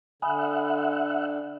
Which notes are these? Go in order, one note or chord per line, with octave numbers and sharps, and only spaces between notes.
D3 E5 F#5 G#5 B5 D#6